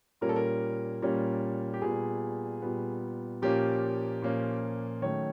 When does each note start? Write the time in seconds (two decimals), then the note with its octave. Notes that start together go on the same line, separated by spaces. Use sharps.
0.21 A#2 G3 A#3 C#4 A#4
0.29 A4
0.36 A#4
1.02 A#2 G3 A#3 C#4
1.74 G4
1.82 A#2 G3 B3 G#4
2.62 A#2 G3 B3
3.42 A#2 F3 A#3 C#4 G4
4.22 A#2 F3 A#3 C#4
5.02 D#3 F#3 A3 C#4 C#5